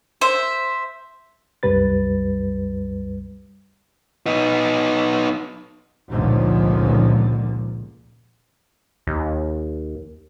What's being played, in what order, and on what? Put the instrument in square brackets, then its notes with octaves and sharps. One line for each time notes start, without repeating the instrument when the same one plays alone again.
[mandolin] C5 E5
[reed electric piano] C2 F#2 G3 B4 A6
[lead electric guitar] B3 D#4
[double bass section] F1 C#2 A#2 D3 D#3 F3
[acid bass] D#2